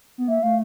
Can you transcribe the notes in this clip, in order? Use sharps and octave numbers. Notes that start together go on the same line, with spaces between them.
B3
A#3 E5
A3 F5